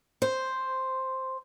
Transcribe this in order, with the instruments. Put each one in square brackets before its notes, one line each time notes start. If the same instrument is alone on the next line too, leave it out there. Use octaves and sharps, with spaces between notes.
[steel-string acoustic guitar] C5